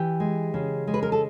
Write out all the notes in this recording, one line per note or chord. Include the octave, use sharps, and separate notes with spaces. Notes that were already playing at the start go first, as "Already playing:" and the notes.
Already playing: E3 G4
G#3
C#3
G#3
B4
A#4
A4